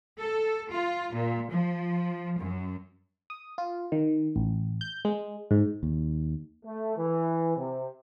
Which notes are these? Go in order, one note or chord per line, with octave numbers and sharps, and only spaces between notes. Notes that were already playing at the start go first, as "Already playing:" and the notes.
A4
F4
A#2
F3
F#2
D#6
F4
D#3
A1
G6
G#3
G#2
D#2
A3
E3
C3